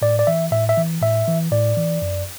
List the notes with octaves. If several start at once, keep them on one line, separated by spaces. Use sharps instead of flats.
A2 D5
D5
E3 E5
A2 E5
E5
E3
A2 E5
E3
A2 D5
E3
F#2